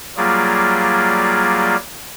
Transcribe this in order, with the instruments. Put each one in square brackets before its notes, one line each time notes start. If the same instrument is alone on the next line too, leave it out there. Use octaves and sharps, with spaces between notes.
[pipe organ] F#3 G3 A#3 F4 G#4 D5